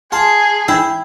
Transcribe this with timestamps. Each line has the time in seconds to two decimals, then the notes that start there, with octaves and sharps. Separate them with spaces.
0.12 F4 G#4 A5
0.68 E4 G5